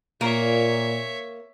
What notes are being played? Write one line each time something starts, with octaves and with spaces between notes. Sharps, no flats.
A#2 A#3 C#5 E5